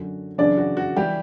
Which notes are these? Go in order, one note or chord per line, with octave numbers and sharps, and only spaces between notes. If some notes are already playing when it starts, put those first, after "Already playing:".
Already playing: F#2 D3 F#4
F#2 C#3 E3 D4 D5
F#4
F#4
E3 G3 G4